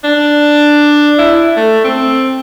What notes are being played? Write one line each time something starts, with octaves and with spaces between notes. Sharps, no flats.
D4
E4
A3
C4